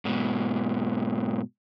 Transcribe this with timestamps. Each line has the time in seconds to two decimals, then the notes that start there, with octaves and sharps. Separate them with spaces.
0.05 G#2 B2